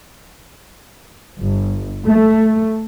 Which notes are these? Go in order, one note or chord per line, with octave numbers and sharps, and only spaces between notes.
G1
A3